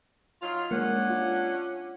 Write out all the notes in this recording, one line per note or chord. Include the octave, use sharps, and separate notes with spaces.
F#3 D#4 F4
G#3 A#3 C#4 D4 F#5
F4